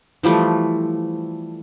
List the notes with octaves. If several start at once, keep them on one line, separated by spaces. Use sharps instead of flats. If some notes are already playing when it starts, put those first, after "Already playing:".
E3 F3 G3 A3